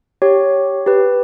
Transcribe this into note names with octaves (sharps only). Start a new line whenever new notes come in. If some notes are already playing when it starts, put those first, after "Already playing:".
G4 C#5
G4 B4